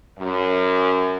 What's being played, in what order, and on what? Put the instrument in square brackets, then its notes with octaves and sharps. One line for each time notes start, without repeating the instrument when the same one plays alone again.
[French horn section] F#2